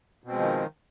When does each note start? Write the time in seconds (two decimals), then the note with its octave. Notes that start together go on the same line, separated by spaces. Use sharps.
0.24 B2
0.28 C4
0.32 G#3
0.36 F3
0.40 D#3